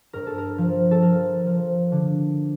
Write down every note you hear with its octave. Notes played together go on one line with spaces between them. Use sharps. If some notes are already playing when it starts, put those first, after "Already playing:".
G2 A#4
A4
A#4
F3
A4
F3 A#4
F3
D3